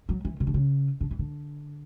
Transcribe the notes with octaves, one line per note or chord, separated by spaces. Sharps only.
F#3
E3
C#3
D3
C#3
D3
E3
D3